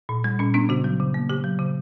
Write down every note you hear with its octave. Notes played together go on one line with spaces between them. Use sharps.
A#2
G3
A#2 C#4
B3 D4
C#3 F#4
F#3
C#3
A#3
C#3 G4
F#3
C#3